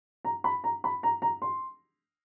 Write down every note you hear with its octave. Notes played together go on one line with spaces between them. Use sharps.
A#5
B5
A#5
B5
A#5
A#5
C6